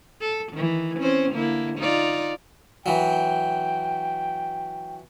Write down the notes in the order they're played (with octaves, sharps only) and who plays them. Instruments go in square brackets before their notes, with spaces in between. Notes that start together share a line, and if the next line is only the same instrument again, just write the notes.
[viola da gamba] A4
D#3 E3
C4 C#4 C5
D3 A#3 E4
D#4 F4 D5
[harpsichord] E3 F#3 [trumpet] G5